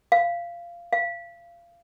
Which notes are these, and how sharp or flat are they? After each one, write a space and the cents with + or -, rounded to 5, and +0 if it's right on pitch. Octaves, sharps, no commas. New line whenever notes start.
F5 -15
F5 -25